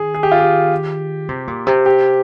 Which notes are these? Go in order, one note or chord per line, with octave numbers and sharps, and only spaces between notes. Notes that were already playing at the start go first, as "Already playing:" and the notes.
Already playing: D#3 G#4
G#4
G4
F4
G4
C3
A#2
C3
G4